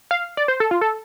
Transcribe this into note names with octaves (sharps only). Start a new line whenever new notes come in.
F5
D5
C5
A4
F4
A4